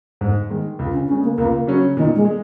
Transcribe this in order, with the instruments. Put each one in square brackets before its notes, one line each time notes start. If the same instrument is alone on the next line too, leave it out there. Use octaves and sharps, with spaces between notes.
[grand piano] G#2
D#3 G#3
C#2
[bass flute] C#4
[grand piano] C#3 G#3 [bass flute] C#4
[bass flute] A#3
[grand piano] C#2 [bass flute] A#3
[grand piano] C#3 F#3 C#4
[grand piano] A#2 [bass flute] D#3
[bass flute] G#3
[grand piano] G#3